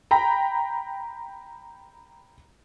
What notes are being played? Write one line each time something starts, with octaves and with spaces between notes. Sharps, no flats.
G5 A#5 B5